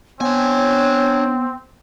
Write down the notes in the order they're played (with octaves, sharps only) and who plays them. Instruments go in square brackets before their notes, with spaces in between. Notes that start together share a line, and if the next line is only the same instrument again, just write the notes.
[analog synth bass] B3 [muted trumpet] C4 [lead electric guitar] D4 G#5 [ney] C#5